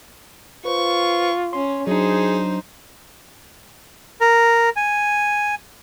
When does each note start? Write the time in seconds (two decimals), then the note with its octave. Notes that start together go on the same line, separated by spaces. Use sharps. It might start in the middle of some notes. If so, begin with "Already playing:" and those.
0.65 F4 B4 C5 C#6
1.53 C#4 C6
1.87 F#3 D4 D#4 G#4 C5
4.21 A#4
4.76 G#5